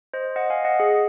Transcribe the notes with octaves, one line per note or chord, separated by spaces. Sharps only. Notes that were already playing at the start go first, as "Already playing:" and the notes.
C5 D#5
D#5 F#5
F5 G#5
D#5 F#5
G#4